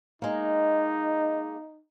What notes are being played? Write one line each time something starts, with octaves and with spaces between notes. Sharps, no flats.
G#3 A#3 D#4